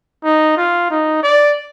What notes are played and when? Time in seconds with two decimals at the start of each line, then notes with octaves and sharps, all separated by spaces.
0.24 D#4
0.57 F4
0.90 D#4
1.23 D5